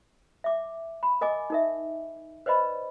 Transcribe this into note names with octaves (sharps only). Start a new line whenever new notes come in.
E5 D6
B5
A#4 D#5 G#5 D6
D#4 A#4 E5
B4 C5 D5 D#5 B5